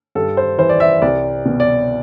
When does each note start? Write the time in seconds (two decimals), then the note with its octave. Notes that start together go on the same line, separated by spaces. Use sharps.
0.15 G2 A4
0.37 C5
0.58 E3 C5
0.69 D5
0.80 E5
1.02 C2 D5
1.45 B2
1.60 D5